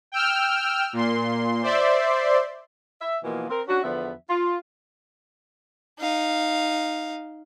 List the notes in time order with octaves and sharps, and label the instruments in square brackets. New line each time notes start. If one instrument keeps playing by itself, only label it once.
[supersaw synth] G5 E6 F6
A#2 C6
C5 D5 E5 C6
[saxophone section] E5
B2 E3 F3 A#3
C4 A#4
C#4 D4 F#4
E2 D3 F3 B3 E5
F4
[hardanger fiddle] D#4 F5